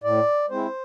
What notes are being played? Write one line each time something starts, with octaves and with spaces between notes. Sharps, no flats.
A2 D5
G#3 C4 E4 C5